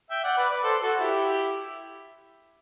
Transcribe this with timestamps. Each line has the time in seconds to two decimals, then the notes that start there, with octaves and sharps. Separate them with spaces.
0.10 E5 G5
0.24 D5 F#5
0.37 B4 D5
0.51 B4 D5
0.64 A4 C5
0.82 F#4 A4
1.00 E4 G4